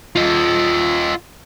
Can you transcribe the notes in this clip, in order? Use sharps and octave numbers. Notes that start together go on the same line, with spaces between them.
F4 D#5